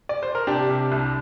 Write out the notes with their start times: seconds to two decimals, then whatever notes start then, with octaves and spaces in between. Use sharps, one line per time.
0.09 D5
0.23 C5
0.35 A#4
0.47 C3 D4 G4
0.69 C3
0.92 C2